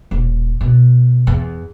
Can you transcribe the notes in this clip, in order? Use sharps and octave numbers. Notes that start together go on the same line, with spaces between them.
D#1
B2
E2